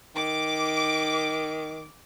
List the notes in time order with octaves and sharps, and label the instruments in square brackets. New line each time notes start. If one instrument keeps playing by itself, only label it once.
[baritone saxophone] D#3 [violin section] D6